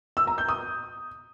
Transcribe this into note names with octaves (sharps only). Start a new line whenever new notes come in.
E6
A#5
G6
D#6